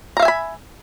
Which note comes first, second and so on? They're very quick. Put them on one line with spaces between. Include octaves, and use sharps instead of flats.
A#5 F5 E5 G#5 B5